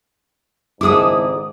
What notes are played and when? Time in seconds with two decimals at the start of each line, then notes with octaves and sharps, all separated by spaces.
0.81 G#1 C#2 G#2 E4 G#4 A4 D6 D#6